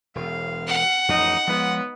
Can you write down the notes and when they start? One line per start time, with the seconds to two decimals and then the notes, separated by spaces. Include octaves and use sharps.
0.15 E1 F5
0.68 F#5
1.09 A1 F2 D#4
1.47 F3 G#3 B3